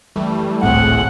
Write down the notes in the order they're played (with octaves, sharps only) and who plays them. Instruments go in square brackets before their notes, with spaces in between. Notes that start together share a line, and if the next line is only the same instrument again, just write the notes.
[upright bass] F#2 [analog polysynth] E3 G3 A3
[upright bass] G#1 C#2 [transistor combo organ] A2 [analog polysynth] A3 C4 G#4 [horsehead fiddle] F#5